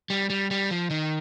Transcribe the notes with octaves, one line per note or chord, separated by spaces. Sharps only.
G3
G3
G3
F3
D#3